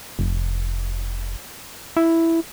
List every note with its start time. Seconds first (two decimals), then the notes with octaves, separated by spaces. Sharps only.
0.19 F1
1.97 E4